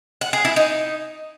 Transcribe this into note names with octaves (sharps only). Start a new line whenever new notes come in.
F#5
G#4
E4
D#4